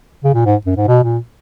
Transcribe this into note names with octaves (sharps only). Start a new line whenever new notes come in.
C#3
A#2
G#2
F#2
G#2
B2
A#2